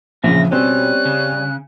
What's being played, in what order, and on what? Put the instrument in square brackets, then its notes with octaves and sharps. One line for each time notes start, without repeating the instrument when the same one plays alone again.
[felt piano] A#1 C#3 [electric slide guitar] E2 F3 E5 [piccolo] A#6
[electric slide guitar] B2 [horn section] G3 C#4 [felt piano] C4 [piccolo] F#6
[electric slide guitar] C#3